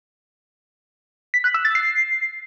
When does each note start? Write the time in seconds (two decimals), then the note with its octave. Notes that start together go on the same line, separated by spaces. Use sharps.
1.34 B6
1.44 F#6
1.54 E6
1.65 A6
1.75 C7